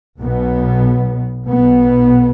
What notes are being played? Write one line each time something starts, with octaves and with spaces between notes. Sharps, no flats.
B1 B2 B3
B1 B2 B3